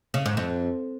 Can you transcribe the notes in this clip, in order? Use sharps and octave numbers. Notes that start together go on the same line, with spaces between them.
C#3
G#2
F2